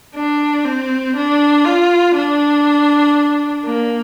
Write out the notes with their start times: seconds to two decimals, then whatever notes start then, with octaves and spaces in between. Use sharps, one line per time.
0.15 D4
0.65 C4
1.16 D4
1.65 F4
2.16 D4
3.65 A#3